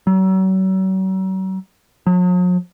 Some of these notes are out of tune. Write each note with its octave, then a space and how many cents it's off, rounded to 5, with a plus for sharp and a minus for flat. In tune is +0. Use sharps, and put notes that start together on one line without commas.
F#3 +40
F#3 -45